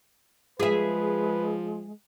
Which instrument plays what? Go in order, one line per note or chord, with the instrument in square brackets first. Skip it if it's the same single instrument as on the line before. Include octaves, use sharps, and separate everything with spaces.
[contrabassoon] F3 [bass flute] G#3 [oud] G#4 E5 [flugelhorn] B4